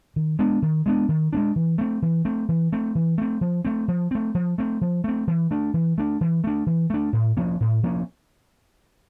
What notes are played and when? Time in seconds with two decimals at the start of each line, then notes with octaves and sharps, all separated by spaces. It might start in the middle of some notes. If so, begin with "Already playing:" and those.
0.16 D#3
0.39 G#3 B3 D4
0.62 D#3
0.86 G#3 B3 D4
1.09 D#3
1.33 G#3 B3 D4
1.56 E3
1.78 A3 C4
2.02 E3
2.25 A3 C4
2.49 E3
2.72 A3 C4
2.95 E3
3.18 A3 C4
3.41 F3
3.65 A3 C4
3.88 F3
4.11 A3 C4
4.35 F3
4.58 A3 C4
4.81 F3
5.04 A3 C4
5.27 E3
5.51 A3 D4
5.74 E3
5.98 A3 D4
6.21 E3
6.44 A3 D4
6.66 E3
6.90 A3 D4
7.13 A2
7.37 F3 A#3 C#4
7.60 A2
7.83 F3 A#3 C#4